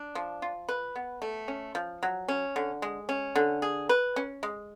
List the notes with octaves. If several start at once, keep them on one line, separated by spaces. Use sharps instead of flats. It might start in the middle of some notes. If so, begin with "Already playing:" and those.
Already playing: D4
F3
F4
B4
B3
A3
C#4
F3
F#3
C#4
D3
G#3
C#4
D3
G#4
B4
C#4
G#3